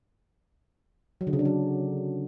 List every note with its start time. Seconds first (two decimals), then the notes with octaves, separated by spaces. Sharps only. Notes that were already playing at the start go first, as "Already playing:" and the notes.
1.21 F#3
1.27 D3
1.33 C#3
1.39 D4
1.45 F#3